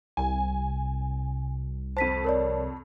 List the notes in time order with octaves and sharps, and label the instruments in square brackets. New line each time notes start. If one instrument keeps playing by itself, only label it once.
[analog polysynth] C2 [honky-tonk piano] G#5
[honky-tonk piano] F2 A5 [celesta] C5 B6 D#7
[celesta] A#4 C#5 D5